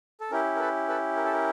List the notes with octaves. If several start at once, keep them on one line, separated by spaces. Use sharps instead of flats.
A4
C#4 E4 G4 A#4
A#4
A4 B4
A4 B4
A#4
A4
A#4